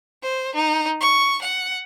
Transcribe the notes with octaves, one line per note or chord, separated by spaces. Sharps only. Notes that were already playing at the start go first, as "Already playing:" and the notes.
C5
D#4
C#6
F#5